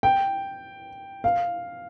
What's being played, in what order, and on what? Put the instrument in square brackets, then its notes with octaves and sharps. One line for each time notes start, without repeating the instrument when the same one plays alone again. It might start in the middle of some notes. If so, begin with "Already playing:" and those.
[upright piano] G5
F5